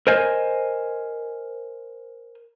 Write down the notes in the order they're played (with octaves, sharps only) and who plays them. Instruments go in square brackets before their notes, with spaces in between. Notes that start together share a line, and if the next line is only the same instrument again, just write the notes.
[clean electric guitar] A#4 C5 D#5 G#5